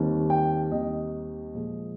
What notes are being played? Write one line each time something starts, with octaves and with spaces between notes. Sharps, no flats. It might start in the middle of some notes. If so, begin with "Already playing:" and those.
Already playing: D#2 D#3 G3 C4
G5
D#2 D#3 G3 C4 D#5
A#2 F3 G#3